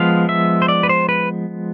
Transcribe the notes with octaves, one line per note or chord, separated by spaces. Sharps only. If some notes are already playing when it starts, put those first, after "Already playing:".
Already playing: F3 G#3 B3 F5
E5
C5
D5
B4
C5
B4